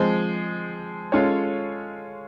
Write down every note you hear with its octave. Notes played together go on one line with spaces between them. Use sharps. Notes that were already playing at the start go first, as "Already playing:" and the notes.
Already playing: F3 G#3 C4
G#3 C#4 F4 A4 C#5